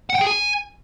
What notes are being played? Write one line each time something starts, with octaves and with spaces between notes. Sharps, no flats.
F#5
G5
G#4
G#5